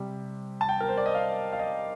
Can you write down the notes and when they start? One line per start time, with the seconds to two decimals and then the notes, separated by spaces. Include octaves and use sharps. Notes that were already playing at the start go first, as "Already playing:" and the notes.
Already playing: C3 G3
0.61 A5
0.69 G5
0.80 A#4
0.89 C5
0.98 D5
1.06 D#5
1.15 F5
1.53 F5
1.59 D#5